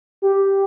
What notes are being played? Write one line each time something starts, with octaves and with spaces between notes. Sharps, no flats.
G4